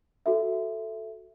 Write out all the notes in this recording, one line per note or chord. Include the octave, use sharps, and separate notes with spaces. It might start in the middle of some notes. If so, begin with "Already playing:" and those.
F#4 A4 E5